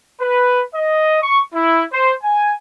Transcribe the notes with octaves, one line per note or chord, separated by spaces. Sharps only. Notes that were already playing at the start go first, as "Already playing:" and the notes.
B4
D#5
C#6
E4
C5
G#5